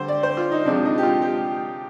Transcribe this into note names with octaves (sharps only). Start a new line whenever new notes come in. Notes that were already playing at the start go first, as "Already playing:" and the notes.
Already playing: D3 G3 C5
D5
C5
F4
D#4
C3 F3 G#3 D4
D#4
G4
F4
G4